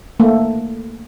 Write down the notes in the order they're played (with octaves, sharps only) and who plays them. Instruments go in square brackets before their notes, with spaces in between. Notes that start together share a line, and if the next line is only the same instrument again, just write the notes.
[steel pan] A3 A#3